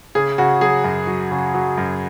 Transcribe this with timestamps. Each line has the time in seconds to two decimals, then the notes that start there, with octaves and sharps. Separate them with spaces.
0.15 C#3 G#4
0.38 C#3 F#4
0.61 F#3 G#4
0.84 F#2
1.07 F#3
1.31 C#3
1.54 F#3
1.78 F#2